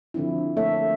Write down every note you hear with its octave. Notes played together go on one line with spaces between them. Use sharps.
D3 F3 C4 D4 E4
A3 A#3 A4 C#5 E5